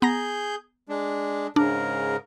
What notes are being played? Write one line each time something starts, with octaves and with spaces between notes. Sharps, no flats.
B3 G#4 A#5 G6 A#6
G#3 D4
G#2 C#3 D4 A#4